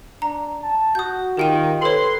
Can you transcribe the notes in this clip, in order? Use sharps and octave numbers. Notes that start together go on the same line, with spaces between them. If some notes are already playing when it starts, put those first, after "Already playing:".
D4 A#5
A5
F#4 D#6 G6
D#3 F4 G4 G5 D#7
A4 B4 C#5 C6